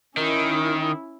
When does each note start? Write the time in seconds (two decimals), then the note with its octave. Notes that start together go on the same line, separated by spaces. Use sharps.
0.17 D#3 C#4 E4